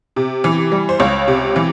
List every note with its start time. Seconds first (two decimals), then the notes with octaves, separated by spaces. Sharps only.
0.16 C3
0.44 E3
0.72 G3
0.89 C5
1.00 C#2 C#5
1.28 C3
1.56 E3